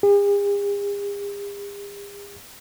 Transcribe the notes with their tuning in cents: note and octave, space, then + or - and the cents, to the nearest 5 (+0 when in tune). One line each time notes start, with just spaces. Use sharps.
G#4 -45